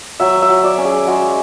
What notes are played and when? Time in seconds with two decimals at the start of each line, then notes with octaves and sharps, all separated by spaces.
0.20 F#3 E5
0.42 E5
0.49 F#3
0.64 D5
0.78 C#4
0.85 G#4
1.07 G#3 F#4